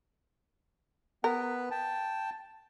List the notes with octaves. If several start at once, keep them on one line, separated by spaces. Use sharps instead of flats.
B3 A#4 B4
G5 A5